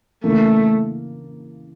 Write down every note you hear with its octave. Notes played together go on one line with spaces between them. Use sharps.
C#3 E3 A3 A#3